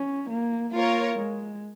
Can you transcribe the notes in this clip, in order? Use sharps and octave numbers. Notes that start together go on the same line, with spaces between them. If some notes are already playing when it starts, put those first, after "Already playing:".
Already playing: C#4
A#3
A#3 F4 A#4 C#5
G#3